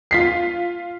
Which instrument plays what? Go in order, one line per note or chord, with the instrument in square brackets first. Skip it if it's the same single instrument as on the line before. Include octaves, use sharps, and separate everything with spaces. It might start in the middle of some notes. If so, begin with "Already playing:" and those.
[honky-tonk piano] F4 B6 C7